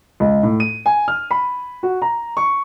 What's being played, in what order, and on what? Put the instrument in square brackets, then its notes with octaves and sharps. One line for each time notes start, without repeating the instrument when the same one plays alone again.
[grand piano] C#2
A2
D#7
G#5
F6
B5
F#4
A#5
C#6